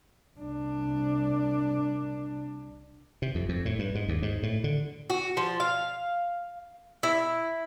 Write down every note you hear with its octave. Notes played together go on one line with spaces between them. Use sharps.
C2 D4
C3
F2
F2
A2
G2
G#2
D#2
G#2
A2
D3
F#4
F3
F5
E4